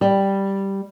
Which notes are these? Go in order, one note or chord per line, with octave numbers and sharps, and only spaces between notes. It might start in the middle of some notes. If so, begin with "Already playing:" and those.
G3